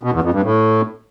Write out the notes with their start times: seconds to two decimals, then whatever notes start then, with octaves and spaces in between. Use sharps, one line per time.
0.03 B2
0.13 E2
0.24 F2
0.34 G2
0.44 A2